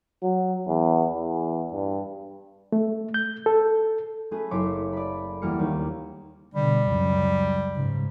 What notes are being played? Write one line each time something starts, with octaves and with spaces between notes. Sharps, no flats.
F#3
E2
E2
G2
A3
G6
A4
A3 C#4 G#4 B4
F#1 A4 C#5 C6 D6 B6
D5 B5
E2 E3 G3 A#3 F6 C#7
D#2
B2 D3 G3
C#2 F#2
G#2 C#3